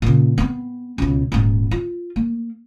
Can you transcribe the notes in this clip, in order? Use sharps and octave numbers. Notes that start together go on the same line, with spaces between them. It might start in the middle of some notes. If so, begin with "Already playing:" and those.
A#2 C#3
B3 C4
C#2 B2
D#1 G#2
F4
A#3